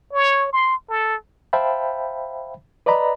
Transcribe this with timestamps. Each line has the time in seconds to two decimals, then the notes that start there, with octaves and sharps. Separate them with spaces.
0.13 C#5
0.52 C6
0.89 A4
1.53 C5 E5 F5 G5 A5 B5
2.86 B4 D5 D#5 A#5 B5